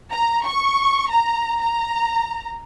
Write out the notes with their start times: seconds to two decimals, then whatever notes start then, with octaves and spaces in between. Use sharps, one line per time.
0.11 A#5
0.44 C#6
1.09 A#5
1.61 A#5